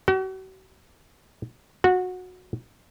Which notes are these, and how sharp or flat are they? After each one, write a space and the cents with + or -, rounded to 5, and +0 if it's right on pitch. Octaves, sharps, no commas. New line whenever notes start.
F#4 +40
F#4 -20